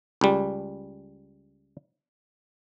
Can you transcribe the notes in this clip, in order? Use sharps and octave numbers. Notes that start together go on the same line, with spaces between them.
C#2 G3